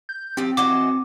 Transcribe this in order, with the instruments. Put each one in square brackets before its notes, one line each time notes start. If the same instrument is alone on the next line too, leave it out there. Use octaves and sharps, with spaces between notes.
[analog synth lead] G6
[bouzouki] F3 G4 [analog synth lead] C4
[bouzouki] E3 F#4 D#5 [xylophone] D6